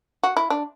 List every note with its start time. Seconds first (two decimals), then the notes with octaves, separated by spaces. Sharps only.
0.23 F#4
0.37 E4
0.50 D4